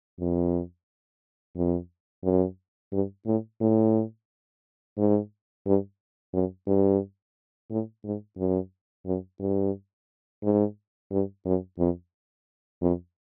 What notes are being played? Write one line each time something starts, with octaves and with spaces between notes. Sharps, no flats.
F2
F2
F#2
G2
A2
A2
G#2
G2
F#2
G2
A2
G#2
F#2
F#2
G2
G#2
G2
F#2
F2
F2